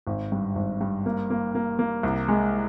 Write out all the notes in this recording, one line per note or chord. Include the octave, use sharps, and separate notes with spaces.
G#1
G2
G#1
G2
A#3
A#3
A#3
A#3
C2
G#3